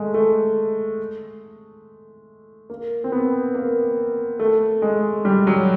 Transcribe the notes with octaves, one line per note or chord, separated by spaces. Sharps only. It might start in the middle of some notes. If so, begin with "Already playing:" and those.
Already playing: G#3 A3
A3
A#3
C4
B3
A#3
A3
G#3
G3
F#3